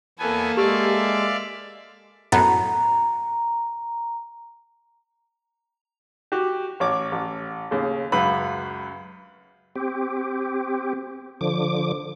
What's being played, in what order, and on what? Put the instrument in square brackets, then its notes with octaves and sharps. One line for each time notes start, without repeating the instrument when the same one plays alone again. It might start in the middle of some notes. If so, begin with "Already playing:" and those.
[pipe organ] E2 B3 G#5 [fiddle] A#3 A4
[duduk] G#3 [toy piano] G4 [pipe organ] D5 E5 F5
[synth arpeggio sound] F#2 A2 B3 [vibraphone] A#5
[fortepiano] F#4 G4
A1 C#5 D6
A1
D#2 C#3
C#2 F#2 B4 B5
[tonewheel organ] C4 G4
D3 F3 D6